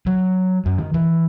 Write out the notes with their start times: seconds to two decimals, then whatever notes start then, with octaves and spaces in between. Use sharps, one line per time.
0.06 F#3
0.66 F#2
0.78 D#3
0.94 E3